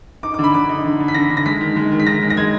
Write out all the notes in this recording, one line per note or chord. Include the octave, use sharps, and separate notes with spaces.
D#4 D6
D6
D3
B5
D3 D6
D#4
D3
D3
B6
D3 A#6
D3
A#6
G#3 B6
D#3
G#3
D#3
B6
D#3 A#6
G#3
A#6
G#3 G#6